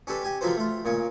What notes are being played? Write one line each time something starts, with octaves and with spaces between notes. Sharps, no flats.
C#4 D4 G4 A4 B4
G4 G#5 C#6
D3 F3 F#3 F4 B4 C5
A3 F4
A#2 C#3 C#5